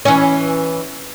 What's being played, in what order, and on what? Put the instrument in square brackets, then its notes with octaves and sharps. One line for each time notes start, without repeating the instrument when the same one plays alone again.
[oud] E3 C#4